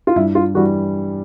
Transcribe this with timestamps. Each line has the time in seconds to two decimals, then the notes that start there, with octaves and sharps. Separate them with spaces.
0.07 F4
0.16 G2 E4
0.35 F4
0.54 E3 G3 F#4